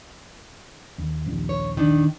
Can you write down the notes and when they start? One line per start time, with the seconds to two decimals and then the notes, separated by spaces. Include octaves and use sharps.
0.98 D#2
1.26 A#1 D#2
1.49 C#5
1.77 D#3 D4